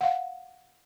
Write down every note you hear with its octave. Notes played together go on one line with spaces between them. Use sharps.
F5 F#5